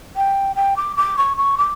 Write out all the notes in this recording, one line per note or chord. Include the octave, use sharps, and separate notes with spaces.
G5
G5
D6
D6
C#6
C#6
D6